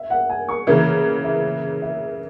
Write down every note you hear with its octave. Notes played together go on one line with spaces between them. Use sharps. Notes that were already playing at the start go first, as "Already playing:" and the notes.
Already playing: E5
F#5
G#5
C#6
C#3 E3 A#3 E5
E5
E5